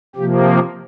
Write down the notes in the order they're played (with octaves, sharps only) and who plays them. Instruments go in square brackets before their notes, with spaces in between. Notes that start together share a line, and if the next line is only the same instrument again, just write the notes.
[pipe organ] C3 F3 A#3 G4